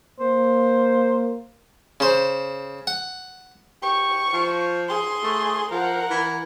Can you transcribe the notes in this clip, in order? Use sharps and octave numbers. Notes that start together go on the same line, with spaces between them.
A#3 C5
C#3 C5
F#5
G4 C#6
F3
G#4 C6
A3
F3 A#4 F#5
E3